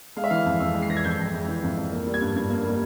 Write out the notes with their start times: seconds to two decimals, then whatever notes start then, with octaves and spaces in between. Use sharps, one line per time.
0.16 G#3 F5
0.24 E5
0.30 E3 F5
0.46 F2
0.60 F2 E6
0.74 G#3
0.82 C7
0.89 E3 A#6
0.97 G#6
1.04 F2 G6
1.19 F2
1.34 G#3
1.48 E3
1.63 F2
1.77 F2
1.92 A#3
2.07 G3
2.14 G#6
2.21 G2
2.36 G2 G#6
2.50 A#3
2.65 G3